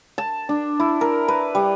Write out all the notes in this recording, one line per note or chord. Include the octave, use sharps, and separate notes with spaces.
A5
D4
E4
A#4
B4
G3